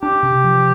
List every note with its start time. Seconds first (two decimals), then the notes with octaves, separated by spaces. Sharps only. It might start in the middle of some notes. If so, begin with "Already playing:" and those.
0.02 D4 G4
0.23 C3
0.44 F3